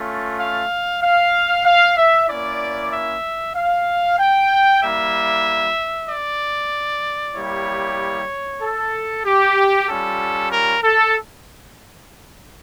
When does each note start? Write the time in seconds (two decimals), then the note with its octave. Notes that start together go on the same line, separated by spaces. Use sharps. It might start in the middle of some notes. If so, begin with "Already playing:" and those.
Already playing: A3 C#4 F4
0.39 F5
1.03 F5
1.65 F5
1.97 E5
2.29 A#3 C#4 E4 D5
2.92 E5
3.56 F5
4.19 G5
4.82 G3 A#3 E4 E5
6.09 D5
7.35 G3 A#3 E4 G4 C#5
8.62 A4
9.25 G4
9.89 G3 C#4 F4 A4
10.52 A#4
10.83 A4